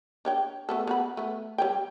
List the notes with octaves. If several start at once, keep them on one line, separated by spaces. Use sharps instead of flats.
D4 C#5 G5
A3 B3 A4
B3 F#4 B5
A3 B3
G3 C#5 G5